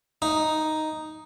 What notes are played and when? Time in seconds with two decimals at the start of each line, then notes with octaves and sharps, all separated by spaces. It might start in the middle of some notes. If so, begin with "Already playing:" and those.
0.22 D#4